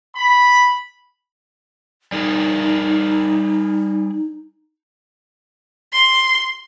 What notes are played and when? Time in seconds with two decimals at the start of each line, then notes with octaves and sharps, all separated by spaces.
0.16 B5
2.12 G3 D#4 G#4 A#4
5.93 C6